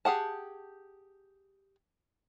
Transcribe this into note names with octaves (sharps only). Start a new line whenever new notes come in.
G4 G#4 F#5 A5